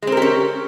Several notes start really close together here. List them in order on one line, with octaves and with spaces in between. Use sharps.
G#3 C4 A#4 G4 C#4